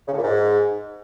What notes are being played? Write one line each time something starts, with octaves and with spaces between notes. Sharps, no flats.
C#3
A2
A#2
G#2